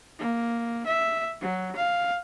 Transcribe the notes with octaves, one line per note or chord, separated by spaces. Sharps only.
A#3
E5
F#3
F5